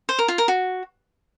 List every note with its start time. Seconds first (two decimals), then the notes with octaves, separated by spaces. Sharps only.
0.09 C5
0.19 A#4
0.28 F4
0.38 A#4
0.48 F#4